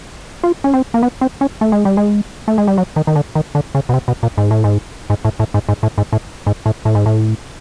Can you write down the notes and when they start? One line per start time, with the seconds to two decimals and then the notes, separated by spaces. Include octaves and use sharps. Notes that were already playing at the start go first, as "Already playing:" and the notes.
0.43 F4
0.64 C#4
0.74 C4
0.94 A#3
1.03 B3
1.21 C4
1.41 C#4
1.61 A3
1.72 G#3
1.85 G3
1.97 G#3
2.48 A3
2.58 G#3
2.67 G3
2.78 F#3
2.96 D#3
3.07 D#3
3.16 D3
3.35 D#3
3.55 D3
3.75 C#3
3.89 B2
3.94 C3
4.08 B2
4.23 A#2
4.38 G#2
4.51 A2
4.64 G#2
5.10 G#2
5.25 A2
5.39 A2
5.54 G#2
5.69 G#2
5.83 A2
5.98 G#2
6.13 A2
6.47 G#2
6.66 A2
6.85 A2
6.95 G#2
7.06 A2